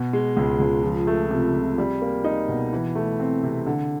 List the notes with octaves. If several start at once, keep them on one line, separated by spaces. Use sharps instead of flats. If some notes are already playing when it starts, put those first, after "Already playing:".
Already playing: B2
G#3
C#2
C#2
F3
A3
C3
C3
G3
A#3
D#4
B2
E3
A3
C4
C3
D3